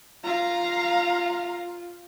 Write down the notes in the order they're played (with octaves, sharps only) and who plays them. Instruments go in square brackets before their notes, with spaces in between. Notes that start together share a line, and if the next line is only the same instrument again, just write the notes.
[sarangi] F4 [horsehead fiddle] F5 A#5